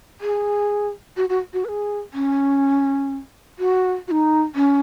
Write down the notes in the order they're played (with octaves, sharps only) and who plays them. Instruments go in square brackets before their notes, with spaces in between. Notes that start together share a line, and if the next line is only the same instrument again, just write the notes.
[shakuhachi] G#4
F#4
F#4
F#4
B4
G#4
C#4
F#4
F#4
D#4
C#4